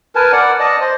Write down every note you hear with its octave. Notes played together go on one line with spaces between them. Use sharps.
A#4 B4 G#5 A5
D5 F#5
D5 D#5 A5
C5